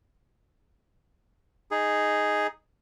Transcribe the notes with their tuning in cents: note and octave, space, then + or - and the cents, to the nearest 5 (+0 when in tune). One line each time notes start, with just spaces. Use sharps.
D#4 +0 G#4 +0